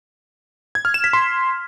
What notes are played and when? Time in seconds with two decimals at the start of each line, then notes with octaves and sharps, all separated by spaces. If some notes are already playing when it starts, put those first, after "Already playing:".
0.75 G#6
0.85 F6
0.94 E7
1.04 B6
1.13 C6